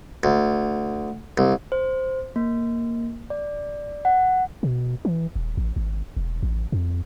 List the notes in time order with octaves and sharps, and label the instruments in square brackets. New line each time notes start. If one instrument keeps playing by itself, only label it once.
[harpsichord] D2
C2
[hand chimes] C5
A#3
D5
F#5
[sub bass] B2
E3
D#1
A1
G#1
E1
A1
F2